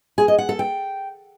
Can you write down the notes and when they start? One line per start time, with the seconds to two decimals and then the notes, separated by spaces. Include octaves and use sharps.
0.18 G#4
0.28 D#5
0.38 F#5
0.49 A4
0.59 G5